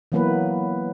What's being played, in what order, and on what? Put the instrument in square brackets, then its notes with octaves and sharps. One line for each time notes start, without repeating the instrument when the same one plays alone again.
[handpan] E3 F#3 A#3 B3 E4 B4